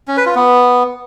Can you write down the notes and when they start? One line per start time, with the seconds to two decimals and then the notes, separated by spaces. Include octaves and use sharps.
0.08 C#4
0.17 B4
0.26 F4
0.35 B3